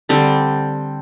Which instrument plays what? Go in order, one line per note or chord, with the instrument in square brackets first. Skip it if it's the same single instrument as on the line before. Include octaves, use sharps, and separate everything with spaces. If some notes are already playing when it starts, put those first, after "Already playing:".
[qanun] D3 G3 C4